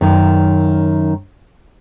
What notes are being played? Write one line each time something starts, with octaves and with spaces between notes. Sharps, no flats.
F#2 D#3